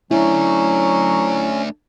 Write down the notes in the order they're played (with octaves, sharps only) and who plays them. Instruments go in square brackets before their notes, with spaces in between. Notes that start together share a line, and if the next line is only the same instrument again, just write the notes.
[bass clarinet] F#3 [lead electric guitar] A3 D4 [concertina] C#4 [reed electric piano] E4